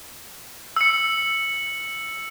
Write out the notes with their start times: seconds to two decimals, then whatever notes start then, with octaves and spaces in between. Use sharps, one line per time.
0.76 E6 C#7